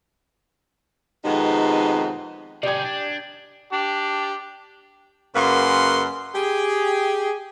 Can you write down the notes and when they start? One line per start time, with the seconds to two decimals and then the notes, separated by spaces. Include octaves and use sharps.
1.25 F2 C3 D#3 G#3 B3 D#4
2.63 C3 G4 G#4 D5 G6 G#6
2.85 D4
3.72 D4 G4
5.36 F#2 C#3 A#3 B4 F#5 C6
6.35 G4 G#4